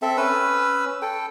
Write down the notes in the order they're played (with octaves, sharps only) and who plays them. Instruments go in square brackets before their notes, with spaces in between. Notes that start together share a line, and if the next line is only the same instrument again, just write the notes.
[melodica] C4 A4 E5
C#4 B4 E6
A4 G5